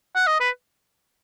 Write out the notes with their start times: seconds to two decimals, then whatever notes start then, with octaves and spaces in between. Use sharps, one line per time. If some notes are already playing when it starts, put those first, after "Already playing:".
0.15 F#5
0.27 D#5
0.40 B4